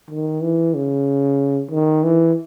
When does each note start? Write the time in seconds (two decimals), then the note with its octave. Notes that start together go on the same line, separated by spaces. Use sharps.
0.10 D#3
0.42 E3
0.74 C#3
1.71 D#3
2.03 E3